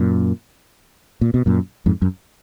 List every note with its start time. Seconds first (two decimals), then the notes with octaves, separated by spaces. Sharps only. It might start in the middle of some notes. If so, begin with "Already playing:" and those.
Already playing: F#2 A#2
1.21 A#2
1.34 B2
1.46 F#2 A#2
1.86 F2 G#2
2.02 F#2